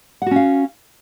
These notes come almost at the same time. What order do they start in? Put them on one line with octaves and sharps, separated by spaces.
F#5 F#4 C#4 F5